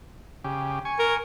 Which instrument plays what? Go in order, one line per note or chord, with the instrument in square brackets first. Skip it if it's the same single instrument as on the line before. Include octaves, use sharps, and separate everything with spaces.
[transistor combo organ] C#3 G4
G#5 C#6
[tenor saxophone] A#4